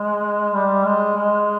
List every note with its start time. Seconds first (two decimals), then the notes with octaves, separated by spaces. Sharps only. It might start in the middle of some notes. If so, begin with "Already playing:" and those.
Already playing: G#3
0.54 G3
0.85 G#3
1.17 G#3